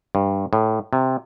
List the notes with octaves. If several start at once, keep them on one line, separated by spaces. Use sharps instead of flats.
G2
A2
C3